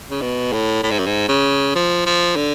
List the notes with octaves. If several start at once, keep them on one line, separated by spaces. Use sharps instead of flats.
C#3
B2
A2
A2
G#2
F#2
G#2
C#3
F3
F3
D3